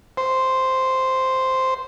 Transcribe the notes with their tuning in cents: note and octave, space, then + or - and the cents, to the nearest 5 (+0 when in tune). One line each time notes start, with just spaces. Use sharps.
C5 -5